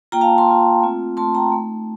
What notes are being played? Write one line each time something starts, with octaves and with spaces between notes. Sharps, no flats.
A#3 F4 G5 A#5
F5 A5
A5 C6
A#3 F4
A3 C4 F4
A3 C4 F4 A5 C6
G5 A#5
A3 D#4